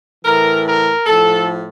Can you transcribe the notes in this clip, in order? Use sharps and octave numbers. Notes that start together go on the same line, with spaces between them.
A2 E3 A#4
A#4
A2 F3 A4